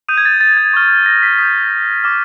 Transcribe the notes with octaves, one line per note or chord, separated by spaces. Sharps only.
D#6 G6 D#7
G#6
A6
A6
G#6
C#6 F6
A#6
B6
D#6 G6 B6
D6 F6